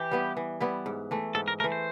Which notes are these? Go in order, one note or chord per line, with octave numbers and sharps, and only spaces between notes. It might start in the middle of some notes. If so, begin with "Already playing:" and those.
Already playing: E3 G4
G3 B3 E4
E3
G3 B3 E4
G#2
E3 A3
G#2 A4
A#4
E3 A3 A#4
C5